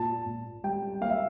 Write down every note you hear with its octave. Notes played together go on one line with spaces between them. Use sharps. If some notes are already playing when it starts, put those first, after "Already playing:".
Already playing: A#2 A5
A#2
G3 G5
A#3 F5
E5